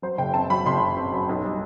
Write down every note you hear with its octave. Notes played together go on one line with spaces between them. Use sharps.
F#3 C5
F#1 G5
C4 A5
F#3 B5
F#1 C6
F#1
C4
F#2
B1
G3